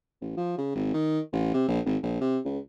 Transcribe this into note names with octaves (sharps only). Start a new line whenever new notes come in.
A1
F3
C#3
G#1
D#3
A1
C3
A#1
G#1
A#1
C3
C#2